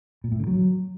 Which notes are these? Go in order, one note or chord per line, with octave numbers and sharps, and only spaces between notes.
A#2
A2
D3
F#3